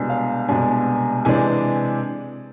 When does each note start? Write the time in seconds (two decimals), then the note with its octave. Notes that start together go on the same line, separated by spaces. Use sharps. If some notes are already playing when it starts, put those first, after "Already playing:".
Already playing: C2 B2 G#3 D4
0.10 F5
0.48 C2 B2 G#3 D4 G#5
1.25 C3 E3 G#3 D4 G#5